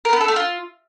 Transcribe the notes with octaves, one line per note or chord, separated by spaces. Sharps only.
A#4
B3
A4
A3
F4